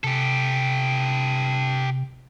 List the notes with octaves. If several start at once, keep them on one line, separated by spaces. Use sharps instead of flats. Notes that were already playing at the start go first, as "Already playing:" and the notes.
C3 G4 A4